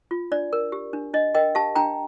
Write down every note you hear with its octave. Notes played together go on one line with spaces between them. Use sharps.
F4
D4 D5
A#4
G4
D4
D4 D#5
A#4 D#5 G5
G4 F5 A5
D4 G5 A#5